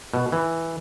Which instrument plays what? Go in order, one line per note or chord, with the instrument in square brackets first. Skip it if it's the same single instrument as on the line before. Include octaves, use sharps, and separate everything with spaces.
[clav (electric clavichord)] B2
E3